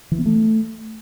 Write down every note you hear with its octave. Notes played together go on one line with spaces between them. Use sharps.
E3
B3
A3